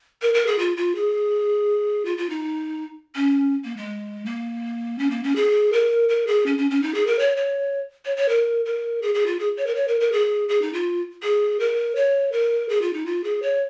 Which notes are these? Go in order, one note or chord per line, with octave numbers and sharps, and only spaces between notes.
A#4
A#4
G#4
F4
F4
G#4
F4
F4
D#4
C#4
A#3
G#3
A#3
C#4
A#3
C#4
G#4
A#4
A#4
G#4
C#4
C#4
C#4
D#4
G#4
A#4
C#5
C#5
C#5
C#5
A#4
A#4
G#4
G#4
F4
G#4
C#5
A#4
C#5
A#4
A#4
G#4
G#4
D#4
F4
G#4
A#4
C#5
A#4
G#4
F4
D#4
F4
G#4
C#5